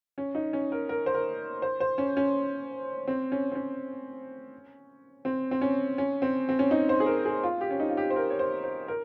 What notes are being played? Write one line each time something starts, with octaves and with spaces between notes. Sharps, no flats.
C#4
D#4
C#4
A#4
A#4
C5
A#4
C5
C5
C#4
C#4
C4
C#4
C4
C#4
C4
C4
C#4
C#4
C4
C4
C#4
D#4
C5
G#4
A#4
G#4
F4
G4
C#4
D#4
F4
G4
C5
A#4
C#5
C5
C5
A#4